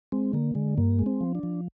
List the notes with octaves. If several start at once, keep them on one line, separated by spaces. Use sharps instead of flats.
G#3 C4
D3 A#3
D3 G#3
G2 A#3
G#3
C4
F3
D4
F3